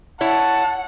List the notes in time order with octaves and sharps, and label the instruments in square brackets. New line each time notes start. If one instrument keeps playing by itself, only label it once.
[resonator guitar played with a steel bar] E4 C#5 [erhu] F#5 [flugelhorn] A5